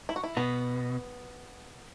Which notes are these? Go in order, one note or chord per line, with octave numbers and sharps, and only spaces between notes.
E4
F#4
E4
B2 B3